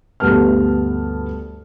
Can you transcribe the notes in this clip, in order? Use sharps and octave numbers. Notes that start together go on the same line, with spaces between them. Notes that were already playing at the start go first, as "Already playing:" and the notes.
D2 G2 B3 A5 F6